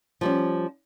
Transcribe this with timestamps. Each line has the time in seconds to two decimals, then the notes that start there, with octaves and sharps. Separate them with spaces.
0.21 F3 G3 C#4